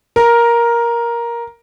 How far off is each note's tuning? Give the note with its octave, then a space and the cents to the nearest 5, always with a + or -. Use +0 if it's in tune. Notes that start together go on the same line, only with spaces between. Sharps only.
A#4 +10